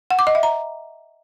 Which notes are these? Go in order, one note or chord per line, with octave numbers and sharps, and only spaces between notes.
F#5
D6
D#5
E5
A#5